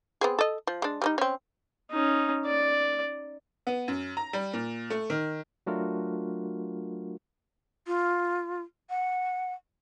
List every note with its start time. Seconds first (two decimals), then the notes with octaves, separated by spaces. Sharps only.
0.21 B3 C4 G#4
0.39 A4 D#5
0.67 F3
0.82 G#3 D4
1.02 G3 C#4 D#4
1.18 C4 C#4
1.91 C#4 D#4
2.46 D5
3.67 B3
3.88 F#2
4.17 A#5
4.33 G3
4.53 A#2
4.90 A3
5.10 D#3
5.66 F#3 A3 D4 F4 F#4 A#4
7.87 F4
8.90 F#5